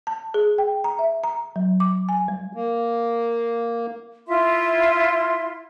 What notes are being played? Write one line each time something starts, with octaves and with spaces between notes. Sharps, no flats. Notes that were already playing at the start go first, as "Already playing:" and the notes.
A5
G#4
G5
A#5
E5
A#5
F#3
D6
G#5
G3
A#3
E4 F4 E5 C6